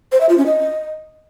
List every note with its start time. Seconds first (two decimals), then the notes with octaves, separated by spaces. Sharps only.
0.12 C5
0.21 E5
0.29 F4
0.38 C#4
0.46 D#5